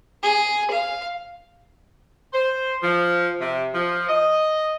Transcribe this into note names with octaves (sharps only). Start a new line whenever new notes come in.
G#4
F5
C5
F3
C3
F3
D#5